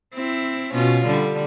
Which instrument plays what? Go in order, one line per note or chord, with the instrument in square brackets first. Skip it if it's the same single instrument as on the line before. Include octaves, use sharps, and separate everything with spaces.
[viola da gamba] C4 E4
B2 C#4 F4
D3 G3